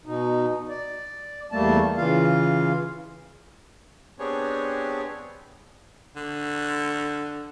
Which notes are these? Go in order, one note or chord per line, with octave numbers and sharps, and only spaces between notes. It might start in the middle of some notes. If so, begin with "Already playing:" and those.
B2 D#4
D5
E2 G3 A3 A#3 A5
C#3 E3 F4 F5
B3 C4 D4 G4 G#4 C#5
D3